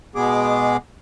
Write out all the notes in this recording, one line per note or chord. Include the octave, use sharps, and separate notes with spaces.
B2 G#3 B3 G#4 D6